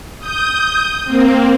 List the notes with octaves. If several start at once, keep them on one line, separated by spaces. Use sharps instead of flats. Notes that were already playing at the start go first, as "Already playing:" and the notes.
D#6 G6
A#3 C4